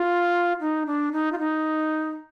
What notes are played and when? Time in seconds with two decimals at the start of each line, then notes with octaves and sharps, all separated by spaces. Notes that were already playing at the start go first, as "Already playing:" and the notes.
Already playing: F4
0.61 D#4
0.86 D4
1.12 D#4
1.32 F4
1.39 D#4